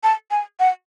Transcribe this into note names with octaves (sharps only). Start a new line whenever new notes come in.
A5
G#5
F#5